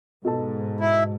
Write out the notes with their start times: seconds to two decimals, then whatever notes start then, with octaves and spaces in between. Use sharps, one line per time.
0.25 G#2 B2 A4 A5
0.81 E4